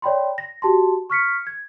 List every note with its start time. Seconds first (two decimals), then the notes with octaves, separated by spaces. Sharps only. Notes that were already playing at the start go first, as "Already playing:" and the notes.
0.02 C#5 D5 G5 B5 C6
0.38 A#6
0.62 F#4 G4 A5 C6
1.10 C#6 F6 B6 C#7
1.47 G#6